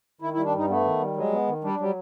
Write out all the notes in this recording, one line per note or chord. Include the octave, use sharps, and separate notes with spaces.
D#3 E4
E4
G3
D4
G2 D#4
A3 B3
D#3
G3
F#3 G#3
B3
D#3
G3 D4
F#3 G3